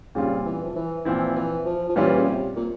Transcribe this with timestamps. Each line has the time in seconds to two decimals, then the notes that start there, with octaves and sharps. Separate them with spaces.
0.15 A#2 C#3 G3 C4 F4
0.45 E3
0.64 F3
0.76 E3
1.05 A#2 E3 F3 C4 E4
1.36 E3
1.66 F3
1.89 F3
1.96 A#2 E3 G3 C#4 F4
2.18 C#3
2.25 C3
2.56 A#2